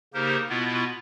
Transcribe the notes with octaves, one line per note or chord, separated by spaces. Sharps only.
C#3 A#3 D#4 G4 A#4 C5
B2 B3 E4 F4